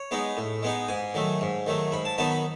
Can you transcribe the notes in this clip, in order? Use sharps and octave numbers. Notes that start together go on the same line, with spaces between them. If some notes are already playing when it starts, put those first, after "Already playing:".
Already playing: C#5
G#3 B3 D#4
A2
G#3 B3 D#4
G#2 G#5
D#3 F#3 A3
G#2
D#3 F#3 A3
G#2 B5
A5
D#3 F#3 B3 D#4 A5
B5